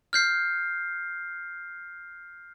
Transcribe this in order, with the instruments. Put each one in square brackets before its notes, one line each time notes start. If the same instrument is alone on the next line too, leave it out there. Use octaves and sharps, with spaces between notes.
[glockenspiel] F6 G6 C7